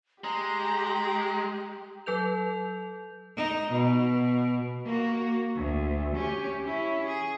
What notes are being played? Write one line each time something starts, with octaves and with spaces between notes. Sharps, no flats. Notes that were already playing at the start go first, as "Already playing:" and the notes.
G#3 G4 A#5
F#3 A4 B4 G6 F7
D#4
B2
A#3 F#4
D2
C#4 G4
C#4 E4
G#4